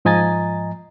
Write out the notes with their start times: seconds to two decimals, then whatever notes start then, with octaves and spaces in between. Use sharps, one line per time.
0.05 G#2 F3 D#5 G#5 A#5 A6